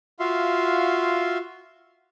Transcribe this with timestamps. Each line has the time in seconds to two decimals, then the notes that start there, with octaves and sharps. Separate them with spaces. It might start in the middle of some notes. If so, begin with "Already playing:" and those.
0.20 F4 F#4 E5 F5 C6